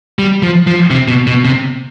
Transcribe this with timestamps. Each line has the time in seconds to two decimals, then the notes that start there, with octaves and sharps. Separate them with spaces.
0.19 G3
0.43 F3
0.67 F3
0.90 C3
1.08 B2
1.27 B2
1.45 C3